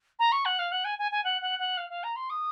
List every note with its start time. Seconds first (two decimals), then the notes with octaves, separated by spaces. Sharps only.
0.19 A#5
0.32 C#6
0.45 F#5
0.59 F5
0.72 F#5
0.85 G#5
0.99 G#5
1.12 G#5
1.24 F#5
1.42 F#5
1.59 F#5
1.77 F5
1.90 F5
2.04 A#5
2.16 C6
2.30 D#6